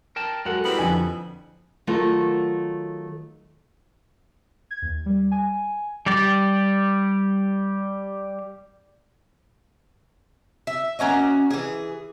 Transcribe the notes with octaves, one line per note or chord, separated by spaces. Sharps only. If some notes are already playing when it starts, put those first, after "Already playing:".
A#4 G5 A5
F#3 G#3 F#4 A4 A#4 F#5
G3 B3 C4 E4 B5
F2 D3 G#5
D#3 F#3 A3 F4 F#4 A#4
G#6
D#2
G3
G#5
G3 G4 D5
E5
A#3 C#4 F#4 D#5
E3 G#4